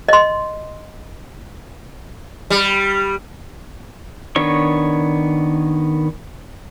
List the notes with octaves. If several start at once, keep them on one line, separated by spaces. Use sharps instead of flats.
D#5 C6
G3
D#3 B3 D4 C#5 C#6